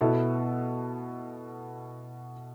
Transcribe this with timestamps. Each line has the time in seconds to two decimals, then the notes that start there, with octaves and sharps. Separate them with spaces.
0.01 B2 B3 E4 A4